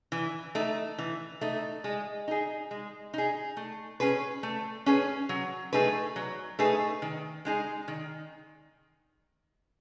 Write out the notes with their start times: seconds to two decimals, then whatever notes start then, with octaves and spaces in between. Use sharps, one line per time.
0.12 E3
0.55 A3 D#4
0.98 E3
1.41 A3 D#4
1.84 G#3
2.28 D#4 G#4
2.71 G#3
3.14 D#4 G#4
3.57 A3
4.00 C#4 G#4 B4
4.43 A3
4.86 C#4 G#4 B4
5.29 F#3
5.73 A3 D#4 G#4 B4
6.16 F#3
6.59 A3 D#4 G#4 B4
7.02 D#3
7.45 G#3 D#4 G#4
7.88 D#3